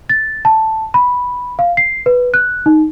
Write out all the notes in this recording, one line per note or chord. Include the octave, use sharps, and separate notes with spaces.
A6
A5
B5
F5
C7
B4
F#6
D#4